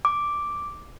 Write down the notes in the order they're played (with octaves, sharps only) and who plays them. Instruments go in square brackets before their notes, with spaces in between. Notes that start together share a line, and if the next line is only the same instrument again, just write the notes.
[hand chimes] D6